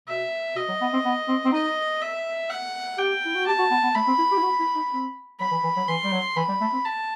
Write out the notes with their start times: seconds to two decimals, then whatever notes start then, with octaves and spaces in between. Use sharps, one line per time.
0.08 B2 E5
0.56 B2 D#5
0.68 F#3
0.81 B3
0.93 C4
1.05 B3
1.28 C4
1.45 C4
1.52 D#4 D#5
2.01 E5
2.50 F#5
2.98 G4 G5
3.25 E4
3.35 F#4
3.46 G4 A5
3.58 F#4
3.71 B3
3.83 B3
3.95 A3 B5
4.07 C4
4.18 E4
4.31 G4
4.37 E4
4.42 F#4
4.60 E4
4.75 D#4
4.92 C4
5.40 F#3 B5
5.51 E3
5.63 E3
5.77 F#3
5.88 E3 C6
6.04 G3
6.12 F#3
6.36 E3 B5
6.48 G3
6.61 A3
6.73 C4
6.85 A5